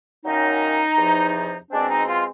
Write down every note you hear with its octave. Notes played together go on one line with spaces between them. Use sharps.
F#2 D#3 F#3 A#3 C#4 D#4
E2 C3 F3
B2 G#3 C4 D4
D#4
F4